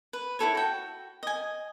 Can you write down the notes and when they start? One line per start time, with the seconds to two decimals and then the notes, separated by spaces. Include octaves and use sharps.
0.13 B4
0.39 E4 G#4 A4 C#5
0.55 F#4 G5
1.23 D#5 G#5